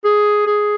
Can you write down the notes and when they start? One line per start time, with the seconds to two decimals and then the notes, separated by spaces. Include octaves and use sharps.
0.05 G#4
0.47 G#4